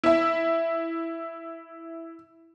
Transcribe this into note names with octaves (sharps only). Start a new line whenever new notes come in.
E4 E5